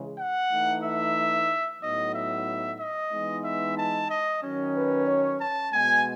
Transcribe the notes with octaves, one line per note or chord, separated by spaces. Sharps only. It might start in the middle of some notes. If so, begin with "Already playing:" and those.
Already playing: C#3 E3 G#3
F#5
E3 A3 D#4
E5
A2 F#3 B3 D#4 D#5
E5
D#5
E3 G#3 B3 D#4
E5
A5
D#5
D#3 F#3 C#4
B4
C#5
A5
B2 G#3 B3 G#5